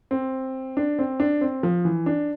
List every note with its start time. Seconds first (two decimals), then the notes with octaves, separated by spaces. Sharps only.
0.11 C4
0.77 D4
0.99 C4
1.20 D4
1.41 C4
1.63 F3
1.85 E3
2.06 D4